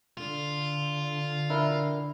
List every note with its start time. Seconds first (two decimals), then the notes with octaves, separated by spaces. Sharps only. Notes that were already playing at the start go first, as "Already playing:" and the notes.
0.17 D3 F4
1.50 D4 E4 A#4